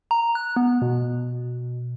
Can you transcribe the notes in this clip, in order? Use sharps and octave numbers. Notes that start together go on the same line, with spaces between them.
A#5
F#6
B3
B2